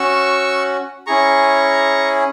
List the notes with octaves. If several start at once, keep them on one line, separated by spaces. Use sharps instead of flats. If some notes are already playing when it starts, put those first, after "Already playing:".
Already playing: C#4 F#4 C#6 E6
C#4 E4 G#4 A#5 C#6